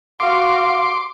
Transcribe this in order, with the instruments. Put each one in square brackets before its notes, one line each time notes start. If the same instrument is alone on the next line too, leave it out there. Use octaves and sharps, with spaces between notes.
[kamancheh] F#4 F5 [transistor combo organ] C6 D6